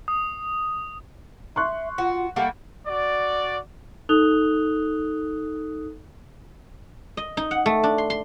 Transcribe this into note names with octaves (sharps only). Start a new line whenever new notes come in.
D#6
E5 C6 C#6 F#6
F4 F#4
G3 A3 A#3 F#5
F#4 D5
D#4 A4 D#6 F#6 F7 G7
D#5
D#4
F#5
A3
D4
C6
C6